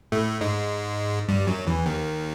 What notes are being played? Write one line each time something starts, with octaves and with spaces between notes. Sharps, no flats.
A2 A3
G#2 G#3
G2 G3
F#2 F#3
E2 E3
D#2 D#3